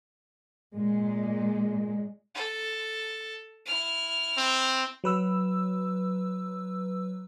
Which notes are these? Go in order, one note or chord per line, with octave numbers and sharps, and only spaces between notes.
A#2 G#3
A4
E4 F6
C4
F#3 B4 E6